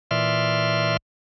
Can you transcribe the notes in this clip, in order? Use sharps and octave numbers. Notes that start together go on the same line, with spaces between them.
A#2 E3 D5 E5 C6 F6